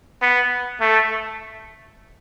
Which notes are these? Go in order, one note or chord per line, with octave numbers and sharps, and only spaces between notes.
B3
A3